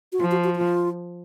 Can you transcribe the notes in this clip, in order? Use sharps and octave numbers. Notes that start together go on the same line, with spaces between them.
F#4
F3 F4
F#4
F#4
F4